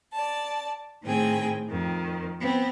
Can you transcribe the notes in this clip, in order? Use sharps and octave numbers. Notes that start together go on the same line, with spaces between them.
D5 A5
A2 D#3 C4 G#4 G5
F2 D#3
B3 C4